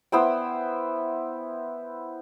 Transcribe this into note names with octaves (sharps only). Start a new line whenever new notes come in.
B3 E4 C5 G5